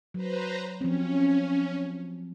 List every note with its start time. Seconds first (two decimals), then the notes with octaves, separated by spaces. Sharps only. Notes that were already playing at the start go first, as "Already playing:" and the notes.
0.14 F#3 B4 C5 A#5
0.81 F3 C4 C#4